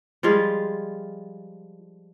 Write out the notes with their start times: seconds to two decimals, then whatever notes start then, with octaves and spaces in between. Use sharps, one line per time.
0.23 F3 G3 G#3 F4